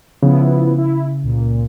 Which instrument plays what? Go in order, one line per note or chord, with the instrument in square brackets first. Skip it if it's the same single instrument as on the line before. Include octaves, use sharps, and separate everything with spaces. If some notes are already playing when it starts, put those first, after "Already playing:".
[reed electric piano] C#3 [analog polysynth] F3 B3 E4
[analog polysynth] E4
C#2 A#2